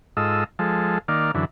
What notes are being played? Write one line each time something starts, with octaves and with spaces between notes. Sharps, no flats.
G#2 F4 A4 D#5 E6
F3 G#3 A4
D#3 A#3 D5 F5
F#2 D3 E3